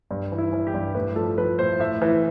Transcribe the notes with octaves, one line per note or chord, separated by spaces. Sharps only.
G2
E3
E4
E3
G4
G2
A2 B4
F3 A4
F3 B4
A2 C5
A2 E5
E3